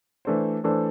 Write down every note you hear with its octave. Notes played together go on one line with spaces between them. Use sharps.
E3 A3 D4 A4 C5
E3 A3 D4 A4 C5